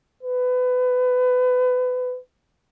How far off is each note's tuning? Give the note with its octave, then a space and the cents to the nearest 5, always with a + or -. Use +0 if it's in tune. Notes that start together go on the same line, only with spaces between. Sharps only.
B4 +25